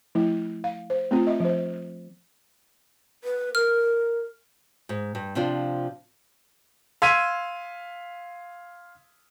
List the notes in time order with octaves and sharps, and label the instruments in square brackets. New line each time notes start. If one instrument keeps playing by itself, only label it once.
[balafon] F3 A3 E4
F5
C5
A3 C4 F4
D#5 E5
F3 C5
[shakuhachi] B4
[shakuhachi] A#4 [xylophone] F6
[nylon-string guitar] G#2
G2
C3 F3 D4 F4
[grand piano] F5 C6 E6 G#6 B6 D#7